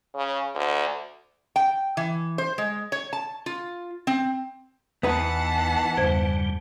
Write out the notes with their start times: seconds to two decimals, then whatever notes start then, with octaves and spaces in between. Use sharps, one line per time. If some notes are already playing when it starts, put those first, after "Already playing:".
0.15 C#3
0.55 D2
1.56 G5
1.97 E3
2.38 C5
2.58 G#3
2.92 C#5
3.13 A5
3.46 F4
4.07 C4
5.03 E2 E3 B3 D#4 B4 F#5 A5
5.97 E2 G2 C#3 G3 C5 G#6